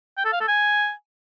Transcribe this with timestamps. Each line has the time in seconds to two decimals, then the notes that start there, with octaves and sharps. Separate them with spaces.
0.17 G5
0.25 A4
0.33 F5
0.40 A4
0.48 G#5